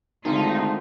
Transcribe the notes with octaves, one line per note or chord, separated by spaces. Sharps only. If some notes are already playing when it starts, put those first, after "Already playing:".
G#1 D3 A3 D#4 F4